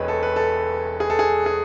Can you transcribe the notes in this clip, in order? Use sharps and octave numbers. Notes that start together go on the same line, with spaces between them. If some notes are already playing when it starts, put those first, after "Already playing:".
Already playing: E1 E2 A3 B4 C#5 D#5
A4
B4
A4
G#4
A4
G#4
G#4